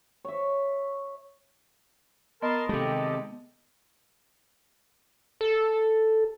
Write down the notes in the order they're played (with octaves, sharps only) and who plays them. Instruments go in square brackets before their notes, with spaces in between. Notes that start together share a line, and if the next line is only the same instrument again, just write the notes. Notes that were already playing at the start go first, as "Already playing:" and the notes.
[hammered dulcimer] C#5 E5
[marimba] B3 [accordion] A#4 A5 C6 [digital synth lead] D#5
[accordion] D#2 G4 A4 [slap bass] C3 G#3
[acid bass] A4